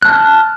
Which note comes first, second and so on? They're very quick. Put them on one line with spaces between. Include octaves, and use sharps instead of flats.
F#6 A5 F6